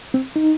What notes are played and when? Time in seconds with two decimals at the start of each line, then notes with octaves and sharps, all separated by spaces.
0.14 C4
0.36 D#4